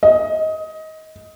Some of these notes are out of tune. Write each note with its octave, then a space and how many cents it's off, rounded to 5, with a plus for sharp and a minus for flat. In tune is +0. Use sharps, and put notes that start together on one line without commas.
D#5 +20